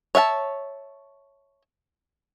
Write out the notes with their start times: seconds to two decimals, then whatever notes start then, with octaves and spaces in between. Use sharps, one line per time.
0.15 C#5 E5 F5 A5